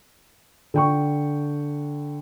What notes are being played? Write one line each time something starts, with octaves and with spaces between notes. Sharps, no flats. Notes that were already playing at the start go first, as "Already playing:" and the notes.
D3 G5 C#6